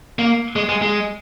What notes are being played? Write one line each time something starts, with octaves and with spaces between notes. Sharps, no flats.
A#3
G#3
G#3
G#3